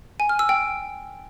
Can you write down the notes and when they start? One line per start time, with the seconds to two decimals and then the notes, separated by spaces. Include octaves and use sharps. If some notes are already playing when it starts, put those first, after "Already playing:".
0.20 G#5
0.29 F6
0.39 E6
0.49 G5